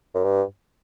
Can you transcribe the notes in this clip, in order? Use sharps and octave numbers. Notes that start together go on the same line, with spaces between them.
F#2
G2